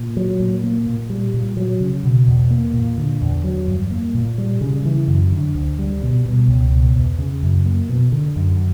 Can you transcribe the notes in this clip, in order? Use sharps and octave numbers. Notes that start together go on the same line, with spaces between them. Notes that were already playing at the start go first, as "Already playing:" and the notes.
Already playing: A#2
F#3
A#2
A#3
A#2
G3
A#2
F#3
C#3
B2
E2
A#3
A#2
D3
E2
F#3
G2
A#3
A#2
G3
C#3
E3
F#2
D3
D2
G3
B2
B2
C#2
B2
E2
C#3
F#2
A#3
B2
D3
F#2